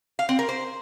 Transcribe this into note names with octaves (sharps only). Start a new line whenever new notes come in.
F5
C4
A#4
C5